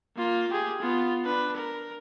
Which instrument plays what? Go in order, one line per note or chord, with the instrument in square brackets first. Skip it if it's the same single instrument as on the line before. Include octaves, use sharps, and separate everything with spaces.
[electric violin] A#3 F4
G4 G#4
B3 F4
D4 B4
A#4